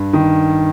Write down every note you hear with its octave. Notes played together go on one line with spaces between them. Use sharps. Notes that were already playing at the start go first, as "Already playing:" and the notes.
Already playing: G2
D#3